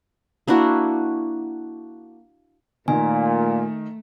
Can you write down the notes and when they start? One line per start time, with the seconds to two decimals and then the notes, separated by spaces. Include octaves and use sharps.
0.47 A#3 D4 E4 F#4
2.88 A#2 D#3 A3 G#5